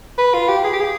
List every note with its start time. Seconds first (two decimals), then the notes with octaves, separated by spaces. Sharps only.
0.18 B4
0.34 F4
0.49 G4
0.64 G#4
0.73 G4
0.81 G#4